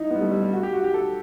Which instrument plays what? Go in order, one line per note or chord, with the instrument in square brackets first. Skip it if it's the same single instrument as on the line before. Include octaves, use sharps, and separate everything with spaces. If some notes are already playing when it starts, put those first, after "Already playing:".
Already playing: [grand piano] D#4 E4
B3
G3
A3
G3
G3
F#4
G4
F#4
G4
A4